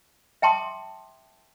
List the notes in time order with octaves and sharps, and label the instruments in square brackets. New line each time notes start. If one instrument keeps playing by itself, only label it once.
[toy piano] E5 G5 A5 C6 D6 D#6